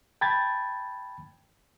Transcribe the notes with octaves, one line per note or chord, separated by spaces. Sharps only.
G5 A5 B5 G#6 A6